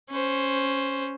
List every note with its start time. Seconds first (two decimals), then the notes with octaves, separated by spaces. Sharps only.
0.10 C#4 C5